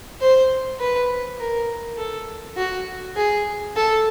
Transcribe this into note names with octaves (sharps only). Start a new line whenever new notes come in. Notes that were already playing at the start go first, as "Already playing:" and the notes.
C5
B4
A#4
A4
F#4
G#4
A4